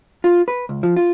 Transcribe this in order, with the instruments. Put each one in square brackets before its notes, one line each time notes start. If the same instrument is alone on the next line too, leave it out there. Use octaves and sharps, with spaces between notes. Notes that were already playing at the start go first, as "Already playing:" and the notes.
[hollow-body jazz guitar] F4
B4
C#2
F3
F4